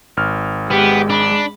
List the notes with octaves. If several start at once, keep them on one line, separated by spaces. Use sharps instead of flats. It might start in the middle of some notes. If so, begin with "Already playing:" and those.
G#1 F6
G#3 B3 G4
D4 B5